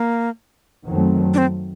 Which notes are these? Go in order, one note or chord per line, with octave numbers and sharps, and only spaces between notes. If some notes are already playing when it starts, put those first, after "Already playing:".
Already playing: A#3
F#2 D#3 F#3 A3 C4
D4
C4